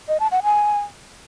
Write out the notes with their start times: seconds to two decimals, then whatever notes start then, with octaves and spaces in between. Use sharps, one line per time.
0.08 D#5
0.20 A5
0.31 F#5
0.43 G#5